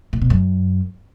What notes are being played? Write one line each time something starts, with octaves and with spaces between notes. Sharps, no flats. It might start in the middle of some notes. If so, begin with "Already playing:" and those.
A#2
B2
F#2